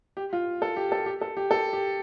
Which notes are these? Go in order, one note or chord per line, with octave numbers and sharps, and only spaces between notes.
G4
F4
A4
G4
A4
G4
A4
G4
A4
G4